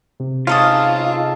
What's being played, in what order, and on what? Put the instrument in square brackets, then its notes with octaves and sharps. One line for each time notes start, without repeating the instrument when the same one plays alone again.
[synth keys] C3
[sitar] G#2 [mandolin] C#4 A4 D#6 [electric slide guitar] F4